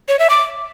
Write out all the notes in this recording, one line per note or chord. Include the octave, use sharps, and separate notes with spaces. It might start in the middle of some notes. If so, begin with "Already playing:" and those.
C#5
E5
D6